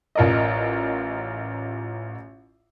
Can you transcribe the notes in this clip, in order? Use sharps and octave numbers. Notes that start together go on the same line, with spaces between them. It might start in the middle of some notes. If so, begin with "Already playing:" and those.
A1 F4 A#4 D5 D#5